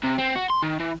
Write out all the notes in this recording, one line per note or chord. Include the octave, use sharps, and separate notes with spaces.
C3
C4
F#4
C6
D#3
E3